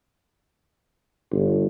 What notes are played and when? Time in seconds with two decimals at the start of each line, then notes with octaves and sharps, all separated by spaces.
1.32 G1